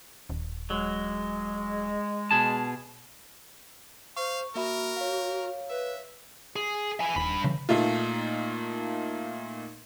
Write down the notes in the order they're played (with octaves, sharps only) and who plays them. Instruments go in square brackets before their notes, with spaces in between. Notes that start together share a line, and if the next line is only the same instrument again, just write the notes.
[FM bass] D#1
[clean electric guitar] F#3 [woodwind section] G#3
[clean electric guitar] B2 G#4 A5
[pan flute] C5 [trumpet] F5 [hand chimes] C#6
[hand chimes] A#3 E5 B5 [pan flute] F#4 [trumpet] A#4
[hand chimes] C#5 F5
[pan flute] B4 [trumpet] E5
[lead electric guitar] G#4
E4 G#5
[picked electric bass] D#1 [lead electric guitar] G2 B5
[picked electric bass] C#3 E3
[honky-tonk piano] A#2 A3 A#3 D#4 F4